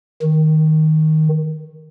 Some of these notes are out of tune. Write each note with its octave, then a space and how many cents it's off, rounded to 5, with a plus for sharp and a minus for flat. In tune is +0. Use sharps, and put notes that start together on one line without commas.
D#3 +5